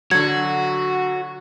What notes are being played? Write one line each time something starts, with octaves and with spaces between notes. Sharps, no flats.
D3 F#3 F#4 G#6